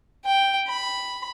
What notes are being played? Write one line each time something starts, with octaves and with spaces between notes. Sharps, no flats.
G5
B5